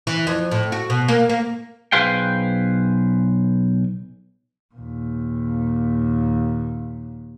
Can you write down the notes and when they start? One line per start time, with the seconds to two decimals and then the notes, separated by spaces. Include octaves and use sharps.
0.07 E3
0.27 F2
0.51 A2
0.72 F#4
0.90 B2
1.08 A#3
1.29 A#3
1.92 B1 G#4 B4 C5 F5 G5
4.74 D#2 A#2